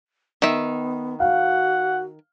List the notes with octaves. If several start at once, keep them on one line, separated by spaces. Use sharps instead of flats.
D#3 B3 E5
F#4 F5 F#5